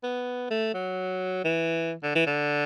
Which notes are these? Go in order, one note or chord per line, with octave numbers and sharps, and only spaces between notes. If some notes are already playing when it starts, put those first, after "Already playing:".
B3
A3
F#3
E3
D3
E3
D3